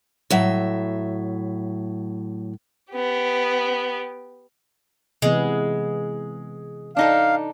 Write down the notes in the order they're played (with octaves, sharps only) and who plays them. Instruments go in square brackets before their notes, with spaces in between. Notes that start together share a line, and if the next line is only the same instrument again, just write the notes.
[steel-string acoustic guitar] A2 F#3 E5
[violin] B3 G4
[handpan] C3 E3 B3 [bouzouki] G#3
[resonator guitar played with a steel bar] D4 D#4 A4 [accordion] F5